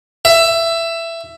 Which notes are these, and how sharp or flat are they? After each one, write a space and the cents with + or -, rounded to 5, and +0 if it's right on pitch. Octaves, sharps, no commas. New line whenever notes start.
E5 +15